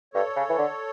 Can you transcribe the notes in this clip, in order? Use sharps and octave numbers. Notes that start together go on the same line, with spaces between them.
G2 A4 C#5
C#3
E3
D3